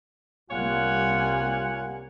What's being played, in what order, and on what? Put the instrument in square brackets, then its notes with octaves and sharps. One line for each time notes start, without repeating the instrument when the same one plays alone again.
[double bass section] C2 G3 A#3 [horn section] F4 C#5 F#5 [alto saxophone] G#5